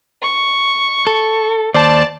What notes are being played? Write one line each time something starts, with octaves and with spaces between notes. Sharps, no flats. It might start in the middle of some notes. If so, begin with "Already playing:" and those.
C#6
A4
D#2 C5 D5 A5